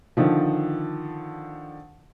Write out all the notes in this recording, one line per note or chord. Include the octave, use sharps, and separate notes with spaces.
D3 D#3 F3